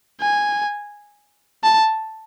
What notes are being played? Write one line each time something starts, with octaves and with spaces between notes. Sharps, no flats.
G#5
A5